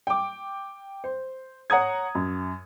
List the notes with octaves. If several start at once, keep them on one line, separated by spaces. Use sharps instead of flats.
G5 D6
C5
C#5 F#5 A#5 D#6 G#6
F#2